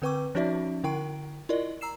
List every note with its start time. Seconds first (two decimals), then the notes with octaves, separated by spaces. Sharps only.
0.02 D3 C4 B4 G5 C#6 D6
0.35 F3 C#4 D#4 F#4 D5 E5
0.84 D3 E4 A#4 G5 C#6 D7
1.49 E4 F4 A#4 D5 D#5
1.81 A#5 E6 C7 E7